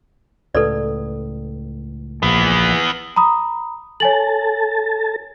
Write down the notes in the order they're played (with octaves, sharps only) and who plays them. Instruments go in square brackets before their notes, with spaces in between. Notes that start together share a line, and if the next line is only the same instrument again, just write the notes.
[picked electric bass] C#2 A2 [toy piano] A4 B4 D5
[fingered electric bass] A#1 [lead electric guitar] E3 B3
[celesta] A#5 B5 D#6
[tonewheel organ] A4 A5 [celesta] C#5 G#5 F#7